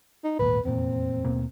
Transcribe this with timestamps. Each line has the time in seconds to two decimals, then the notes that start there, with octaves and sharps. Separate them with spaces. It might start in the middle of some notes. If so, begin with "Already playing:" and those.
0.24 D#4
0.39 G#1 D#2 A#2 B4
0.65 F1 E2 A#2 C4
1.25 D#2 B2 A#3